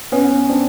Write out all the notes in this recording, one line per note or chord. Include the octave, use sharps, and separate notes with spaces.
B3 C#4
C4 D4